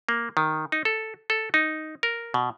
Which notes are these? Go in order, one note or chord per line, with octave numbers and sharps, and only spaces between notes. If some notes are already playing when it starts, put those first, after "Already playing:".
A#3
D#3
D#4
A4
A4
D#4
A#4
B2